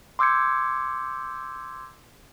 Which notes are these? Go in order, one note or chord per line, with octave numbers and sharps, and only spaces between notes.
C6 D6 E6 G6 G#6 C#7